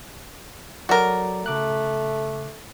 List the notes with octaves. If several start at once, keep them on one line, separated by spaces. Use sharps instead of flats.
F#3 F#4 A4 A#4 D5
C#3 A3 D6 F#6